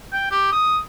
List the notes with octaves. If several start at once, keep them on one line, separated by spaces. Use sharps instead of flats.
G5
G4
D#6